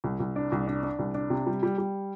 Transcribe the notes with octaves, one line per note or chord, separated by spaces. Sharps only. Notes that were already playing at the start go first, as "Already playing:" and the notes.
C2
C2
D4
C2
D4
D4
C2
D4
C3
G3
G3
G3